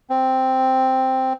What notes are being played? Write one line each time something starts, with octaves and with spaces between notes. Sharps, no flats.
C4